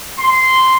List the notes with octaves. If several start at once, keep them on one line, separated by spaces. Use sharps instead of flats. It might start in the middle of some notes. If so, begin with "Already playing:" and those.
C6